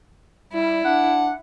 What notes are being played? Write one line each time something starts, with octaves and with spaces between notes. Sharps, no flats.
G3 E4
D4 F#5